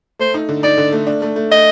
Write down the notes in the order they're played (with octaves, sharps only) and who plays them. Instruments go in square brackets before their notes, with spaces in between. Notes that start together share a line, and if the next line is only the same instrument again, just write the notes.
[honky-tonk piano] A3 [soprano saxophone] C5
[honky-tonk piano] D#4
D3
[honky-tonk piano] D#4 [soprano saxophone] D5
[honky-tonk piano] D3
A3
D4
A3
A3
[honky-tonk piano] A3 [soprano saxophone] D#5